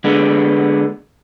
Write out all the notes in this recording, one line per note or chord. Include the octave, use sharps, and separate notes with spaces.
D3 G#3 B3